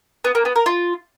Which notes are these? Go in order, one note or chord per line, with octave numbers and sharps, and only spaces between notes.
B3
A#3
B3
A#4
F4